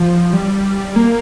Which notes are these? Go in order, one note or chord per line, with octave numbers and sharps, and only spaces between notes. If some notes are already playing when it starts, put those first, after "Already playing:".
Already playing: F3
G3
A#3